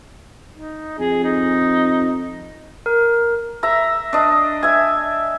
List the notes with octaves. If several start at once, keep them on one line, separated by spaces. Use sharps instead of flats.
D#4
F2 G#4
D#4
A#4
E5 A#5
D4 D#5
E5 G#5